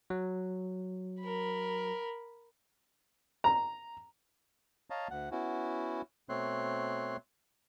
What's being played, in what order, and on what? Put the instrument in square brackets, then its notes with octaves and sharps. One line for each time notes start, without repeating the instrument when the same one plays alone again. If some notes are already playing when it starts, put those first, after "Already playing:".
[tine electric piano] F#3
[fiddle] A#4 B5
[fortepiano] A#5
[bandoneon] C#5 D#5 F5 A5 A#5
D2 F#5
B3 C#4 E4 F#4
B2 A3 C4 C#5 C6 F#6